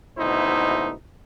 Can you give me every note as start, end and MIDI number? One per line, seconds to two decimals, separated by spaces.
0.18 0.91 32
0.18 0.91 38
0.18 0.91 47
0.18 0.91 63
0.18 0.91 64
0.18 0.91 72